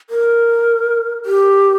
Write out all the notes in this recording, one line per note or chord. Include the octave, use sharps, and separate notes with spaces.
A#4
G4